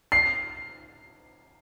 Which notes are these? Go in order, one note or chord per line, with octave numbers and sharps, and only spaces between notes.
C7